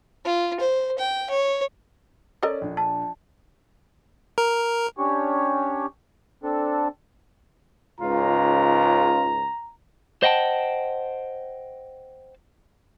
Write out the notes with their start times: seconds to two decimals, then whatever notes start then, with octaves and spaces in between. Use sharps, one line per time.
0.25 F4
0.60 C5
0.98 G5
1.30 C#5
2.43 C#4 A4 A#4 D5 D#5
2.61 A#1 D4
2.77 A5
4.38 A#4
4.97 C#4 D4 G4 C#5
6.43 C4 D4 A4
8.01 C#2 G#2 C#3 F4 A#5
10.23 C5 D#5 F#5 G5 A5